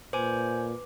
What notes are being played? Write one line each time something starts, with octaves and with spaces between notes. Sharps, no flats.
A#2 B4 C5 G#5 D6